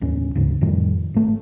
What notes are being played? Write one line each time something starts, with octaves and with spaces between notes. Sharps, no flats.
A1 D#2 C#4
D2 G#2 C#3
F2 A2 D#3 G3
G#1 A3